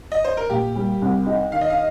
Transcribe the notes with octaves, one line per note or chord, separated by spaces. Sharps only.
D#5
C5
A#4
A#2 G4
G3
C2
D#4
D#3 F5
D#5
F5